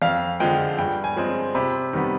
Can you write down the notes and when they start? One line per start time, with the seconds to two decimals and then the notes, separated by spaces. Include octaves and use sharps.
0.02 F2 F5
0.40 D3 F3 G#3 G5
0.78 G2 G5
1.04 G#5
1.17 F3 G#3 C4
1.55 C3 B5
1.93 D#3 G3 B3